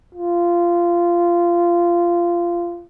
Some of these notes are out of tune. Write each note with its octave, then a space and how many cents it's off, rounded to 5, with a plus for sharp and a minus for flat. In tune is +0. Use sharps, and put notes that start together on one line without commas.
F4 -15